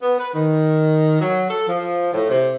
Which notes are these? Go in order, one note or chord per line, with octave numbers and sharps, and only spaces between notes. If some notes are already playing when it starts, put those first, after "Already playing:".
B3
B4
D#3
F#3
A4
F3
A2
C3